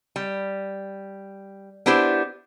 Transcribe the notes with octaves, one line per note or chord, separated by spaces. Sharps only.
G3
B3 D4 E4 G4 C5